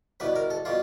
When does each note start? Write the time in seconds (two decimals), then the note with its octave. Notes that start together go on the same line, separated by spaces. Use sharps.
0.20 C2 B2 G3 B4
0.36 A#4
0.50 A4
0.65 B2 G3 F4